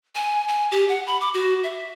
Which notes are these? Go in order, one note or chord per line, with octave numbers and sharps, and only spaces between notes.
G#5
G#5
G4
F#5
B5
D6
F#4
E5